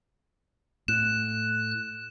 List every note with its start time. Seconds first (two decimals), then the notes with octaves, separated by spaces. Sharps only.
0.88 A2 F#6 E7